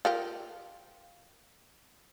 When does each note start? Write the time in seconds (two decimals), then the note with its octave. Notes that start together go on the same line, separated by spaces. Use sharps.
0.05 F4 G4 A#4